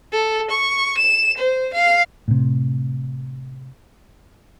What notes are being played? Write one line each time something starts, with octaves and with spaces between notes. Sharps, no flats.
A4
C#6
E7
C5
F5
A2 C3